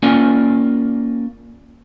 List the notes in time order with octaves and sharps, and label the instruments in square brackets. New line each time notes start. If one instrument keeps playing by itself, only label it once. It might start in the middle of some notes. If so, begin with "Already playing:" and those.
[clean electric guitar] A#3 C#4 F4 A#4 D5 G#5